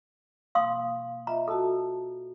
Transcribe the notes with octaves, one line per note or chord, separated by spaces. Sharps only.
B2 A#3 F5 C6 D#6
F4 D#5 E5 A#5
F#4 A4 A5 E6